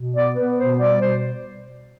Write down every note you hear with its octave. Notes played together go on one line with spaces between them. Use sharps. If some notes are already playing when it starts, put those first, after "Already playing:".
Already playing: B2
B3 D5
B3 B4
B2 C5
G3 D5
B2 C5